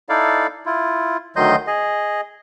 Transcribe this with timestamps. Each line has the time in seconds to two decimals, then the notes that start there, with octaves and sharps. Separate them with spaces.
0.09 D#4 E4 A4 D5 F5
0.66 E4 F4
1.36 D2 D#3 F#3 D#5 C6 G6
1.67 G#4 D#5